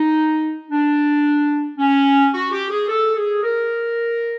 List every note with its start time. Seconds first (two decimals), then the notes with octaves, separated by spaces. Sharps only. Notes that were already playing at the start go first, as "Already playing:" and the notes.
Already playing: D#4
0.70 D4
1.78 C#4
2.33 F#4
2.51 G4
2.69 G#4
2.88 A4
3.15 G#4
3.43 A#4